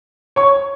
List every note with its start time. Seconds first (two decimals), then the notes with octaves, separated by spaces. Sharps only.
0.36 C#5 C#6